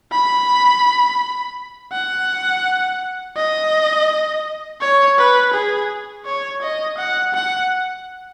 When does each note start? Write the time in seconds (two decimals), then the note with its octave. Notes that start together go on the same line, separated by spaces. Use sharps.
0.12 B5
1.93 F#5
3.37 D#5
4.81 C#5
5.18 B4
5.54 G#4
6.26 C#5
6.62 D#5
6.98 F#5
7.34 F#5